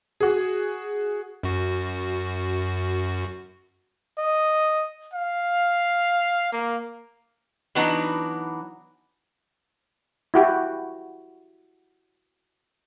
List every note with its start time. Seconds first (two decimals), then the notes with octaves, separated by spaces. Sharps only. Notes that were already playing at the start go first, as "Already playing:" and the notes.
0.20 F#4 G#4
1.43 F#2 F#4
4.18 D#5
5.13 F5
6.52 A#3
7.75 E3 F#3 B3 D4 D#4
10.34 E4 F#4 G4